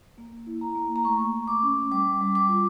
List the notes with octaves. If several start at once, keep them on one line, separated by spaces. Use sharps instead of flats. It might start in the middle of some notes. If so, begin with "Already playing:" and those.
A#3
E4
A#5
A#3
A#5
A3 C#6
A3
D6
C#4
G3 D6
G3
D6
F4